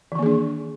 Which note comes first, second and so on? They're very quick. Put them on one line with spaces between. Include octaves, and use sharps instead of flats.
E3 D#3 A#3 G#4 D4